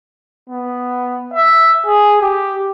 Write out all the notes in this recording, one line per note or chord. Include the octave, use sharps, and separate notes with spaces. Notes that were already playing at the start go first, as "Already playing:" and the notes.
B3
E5
G#4
G4